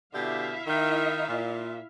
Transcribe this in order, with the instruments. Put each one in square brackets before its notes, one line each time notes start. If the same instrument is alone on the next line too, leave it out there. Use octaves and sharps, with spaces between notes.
[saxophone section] B2 D3 G4 [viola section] E4 E5 F5
[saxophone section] D#3
A#2